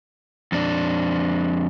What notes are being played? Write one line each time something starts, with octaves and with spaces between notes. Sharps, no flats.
F2 D4